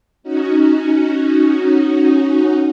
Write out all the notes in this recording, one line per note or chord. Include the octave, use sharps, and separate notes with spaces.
C#4 D#4 F#4